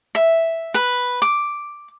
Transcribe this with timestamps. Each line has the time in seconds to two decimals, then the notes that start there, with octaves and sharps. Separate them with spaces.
0.15 E5
0.74 B4
1.22 D6